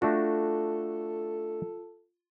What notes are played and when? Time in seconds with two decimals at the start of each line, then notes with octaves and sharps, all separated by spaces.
0.02 A3 D4 F4 F#4 A4